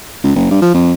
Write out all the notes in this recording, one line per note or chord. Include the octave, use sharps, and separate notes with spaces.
C#2
F#1
G2
F3
F2